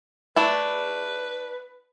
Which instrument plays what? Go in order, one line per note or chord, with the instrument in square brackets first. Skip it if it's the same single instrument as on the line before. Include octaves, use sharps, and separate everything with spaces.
[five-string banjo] A3 D4 E4 [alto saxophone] B4